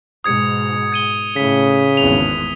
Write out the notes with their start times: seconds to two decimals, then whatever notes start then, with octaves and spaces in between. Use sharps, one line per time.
0.24 G#2 B2 D#6 G#6 C#7
0.92 G#6 D#7 G7
1.36 A2 C#3 B6
1.97 G#1 E2 F7